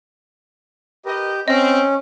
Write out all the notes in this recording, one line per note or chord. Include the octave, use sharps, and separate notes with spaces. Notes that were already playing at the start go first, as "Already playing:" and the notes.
G4 A#4 B4 D#5
C4 C#4 D#5